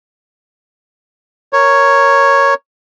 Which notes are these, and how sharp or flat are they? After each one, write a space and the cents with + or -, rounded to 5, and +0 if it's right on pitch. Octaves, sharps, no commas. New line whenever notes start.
A#4 +0 C#5 +0